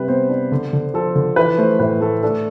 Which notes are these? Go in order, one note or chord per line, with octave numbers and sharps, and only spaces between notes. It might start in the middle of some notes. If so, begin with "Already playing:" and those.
Already playing: C3 G3 B4
B3 C5
D4
D3
D3
F3 A4
D3
E3 B4
A3 C5
A2 B4
A3 A4
D4 A4